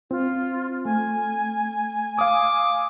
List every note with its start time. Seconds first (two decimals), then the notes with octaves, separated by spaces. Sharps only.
0.11 C4 F4
0.85 A3 G#5
2.19 F5 D6 D#6